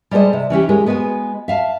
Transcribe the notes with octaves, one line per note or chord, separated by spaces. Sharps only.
G3 G#3 A4 A#4 C5 D#5
C3
E3 C#4 E4 G4
G#3 G4 A#4
G#3 B3 F#4 C5 G#5
E5 F5 A5